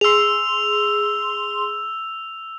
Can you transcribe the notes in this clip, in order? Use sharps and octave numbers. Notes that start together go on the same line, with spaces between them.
G#4 C6 E6 F7